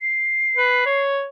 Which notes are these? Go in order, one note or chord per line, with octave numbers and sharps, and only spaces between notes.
C7
B4
C#5